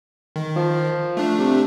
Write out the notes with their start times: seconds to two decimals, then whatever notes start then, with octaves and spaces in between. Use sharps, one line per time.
0.36 D#3
0.56 F3
1.17 A3 D4
1.39 C3